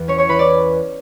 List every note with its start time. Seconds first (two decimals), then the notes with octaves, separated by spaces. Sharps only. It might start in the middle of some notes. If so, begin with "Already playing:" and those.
Already playing: E2 E3 B4
0.08 C#4 C#5 C#6
0.18 C#5 C#6
0.29 E3 B4 B5
0.39 D5 D6